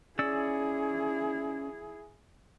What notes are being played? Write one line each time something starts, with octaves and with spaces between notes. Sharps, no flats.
C#4 E4 G#4 D5 E6